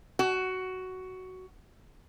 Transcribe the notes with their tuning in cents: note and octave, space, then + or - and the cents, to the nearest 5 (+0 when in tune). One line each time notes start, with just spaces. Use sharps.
F#4 +10